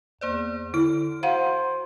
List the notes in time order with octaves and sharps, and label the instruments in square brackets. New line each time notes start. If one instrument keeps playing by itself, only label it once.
[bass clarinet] E2 [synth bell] A#3 C5 D5
[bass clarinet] D3 [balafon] E4 [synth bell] F6 D7
[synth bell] F#4 [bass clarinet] C5 [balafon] F5 F#5